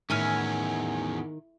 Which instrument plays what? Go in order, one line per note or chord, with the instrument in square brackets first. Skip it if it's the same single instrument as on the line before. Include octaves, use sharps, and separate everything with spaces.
[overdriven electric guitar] E2 C#4 [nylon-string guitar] A2 [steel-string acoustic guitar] D#3 [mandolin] E4 G#5 F6